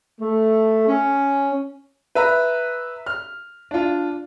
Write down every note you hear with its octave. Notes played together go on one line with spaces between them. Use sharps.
A3
C#4
B4 E5 A#5
F6
D4 F4